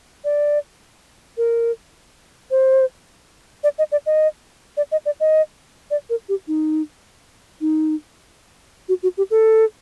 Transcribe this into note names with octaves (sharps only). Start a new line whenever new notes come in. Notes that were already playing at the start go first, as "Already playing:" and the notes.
D5
A#4
C5
D5
D#5
D5
D#5
D5
D#5
D5
D#5
D5
A#4
G4
D#4
D#4
F#4
F#4
G4
A4